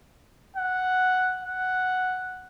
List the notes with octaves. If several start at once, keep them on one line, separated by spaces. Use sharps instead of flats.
F#5
F#5